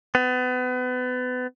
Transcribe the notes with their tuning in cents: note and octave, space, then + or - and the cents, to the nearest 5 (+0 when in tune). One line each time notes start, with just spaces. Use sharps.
B3 +30